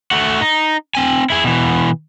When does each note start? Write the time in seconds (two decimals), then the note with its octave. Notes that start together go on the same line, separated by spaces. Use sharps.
0.11 A3 F#4
0.41 D#4
0.95 C4 G#5
1.30 E4 G#4
1.44 B2 E3